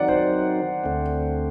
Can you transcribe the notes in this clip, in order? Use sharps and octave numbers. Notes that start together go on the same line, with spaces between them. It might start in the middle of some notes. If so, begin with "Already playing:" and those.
Already playing: D#3 F#3 C4 D#4 D5 F#5
C5
D2 D3 A3 C4